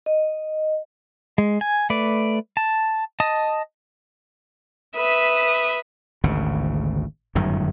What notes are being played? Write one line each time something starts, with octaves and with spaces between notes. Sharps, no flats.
D#5
G#3
G#5
A3 B4 D5
A5
D#5 A5 D#6
B4 E5 D#6
G#1 D2 C#3
G1 F#2 A2 D#3